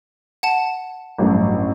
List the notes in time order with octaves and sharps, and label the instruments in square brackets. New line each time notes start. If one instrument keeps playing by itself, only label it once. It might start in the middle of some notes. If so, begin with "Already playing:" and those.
[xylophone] F#5 A5
[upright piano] A1 G2 F#3 A3